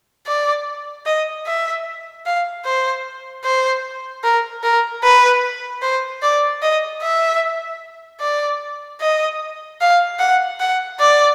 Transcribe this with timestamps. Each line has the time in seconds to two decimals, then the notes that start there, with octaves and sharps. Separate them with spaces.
0.27 D5
1.06 D#5
1.46 E5
2.26 F5
2.65 C5
3.45 C5
4.24 A#4
4.63 A#4
5.04 B4
5.82 C5
6.23 D5
6.63 D#5
7.02 E5
8.21 D5
9.01 D#5
9.81 F5
10.19 F#5
10.60 F#5
11.00 D5